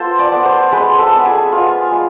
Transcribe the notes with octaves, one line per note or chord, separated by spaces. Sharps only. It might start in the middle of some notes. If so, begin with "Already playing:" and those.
Already playing: B3 F4 A4 C5 A5 C6
D5 D6
B3
C5 C6
G#3 B4 B5
A4 A5
B3
G#4 G#5
B3 F4 F5
G#3